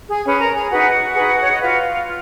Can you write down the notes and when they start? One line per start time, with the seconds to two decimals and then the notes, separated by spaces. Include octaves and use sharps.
0.09 G#4 G#5
0.24 C#4 G#4 B4
0.40 A#4 A#5
0.54 G#4 G#5
0.70 D#4 F#4 G#4 B4 F#5
1.15 D#4 G#4 B4
1.40 C#5
1.51 D#5
1.61 F4 F#4 B4 F5
2.06 F4